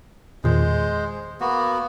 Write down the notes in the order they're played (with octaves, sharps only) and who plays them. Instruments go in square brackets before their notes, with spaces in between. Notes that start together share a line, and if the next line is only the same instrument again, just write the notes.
[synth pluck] E2 A#2 D#3 [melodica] G#3 C5
[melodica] A#3 B3 F#4